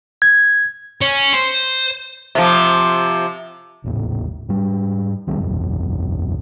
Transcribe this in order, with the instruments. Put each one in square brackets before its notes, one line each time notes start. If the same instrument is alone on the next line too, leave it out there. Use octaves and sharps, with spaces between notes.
[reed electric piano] G#6
[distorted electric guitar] C#4
C5
[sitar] C3 F3
[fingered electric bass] G#1 D#2 A2
G#2 G3
C2 D#3 G3 C4
F#1 B1 E2